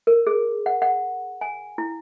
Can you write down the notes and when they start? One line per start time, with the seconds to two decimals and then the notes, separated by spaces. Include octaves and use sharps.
0.07 A#4
0.27 G#4
0.66 F#5
0.82 F#5
1.41 G#5
1.78 E4